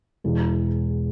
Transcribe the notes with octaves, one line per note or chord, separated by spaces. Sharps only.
E1 E2 E3